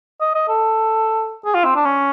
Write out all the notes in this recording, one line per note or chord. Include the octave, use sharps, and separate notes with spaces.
D#5
D#5
A4
G#4
F4
C4
D4
C#4